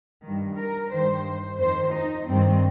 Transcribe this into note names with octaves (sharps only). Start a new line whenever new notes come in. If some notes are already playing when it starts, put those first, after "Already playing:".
G2 D#3
A#4
G2 D#3 C5
F2 D#3 C5
D#4
G2 D#3 C4